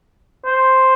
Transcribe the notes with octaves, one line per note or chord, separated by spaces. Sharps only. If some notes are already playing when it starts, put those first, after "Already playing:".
C5